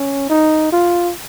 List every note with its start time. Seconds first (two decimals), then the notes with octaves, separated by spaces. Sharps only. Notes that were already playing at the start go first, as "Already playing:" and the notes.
Already playing: C#4
0.29 D#4
0.72 F4